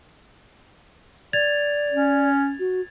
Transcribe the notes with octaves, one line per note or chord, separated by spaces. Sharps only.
D5 G#6 A6 F7
C#4
F#4